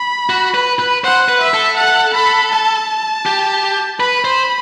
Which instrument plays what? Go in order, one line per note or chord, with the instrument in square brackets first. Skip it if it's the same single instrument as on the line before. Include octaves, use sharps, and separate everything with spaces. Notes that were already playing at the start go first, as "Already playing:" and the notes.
Already playing: [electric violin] B5
[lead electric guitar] F#4
B4
B4
[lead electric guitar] C5 [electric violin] F#5
[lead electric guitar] B4
[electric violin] E5
[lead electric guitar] A4
[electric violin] F#5
B5
A5
[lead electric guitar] G4
[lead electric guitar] B4 [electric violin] B5
[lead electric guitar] C5